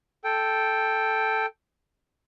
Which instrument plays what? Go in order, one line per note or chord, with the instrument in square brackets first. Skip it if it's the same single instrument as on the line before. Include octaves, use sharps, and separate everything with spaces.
[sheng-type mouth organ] A4 G5